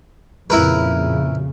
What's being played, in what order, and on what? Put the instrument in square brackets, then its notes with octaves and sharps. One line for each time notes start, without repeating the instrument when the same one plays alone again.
[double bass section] F2 A#2 C#3 [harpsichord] E4 A#4 B4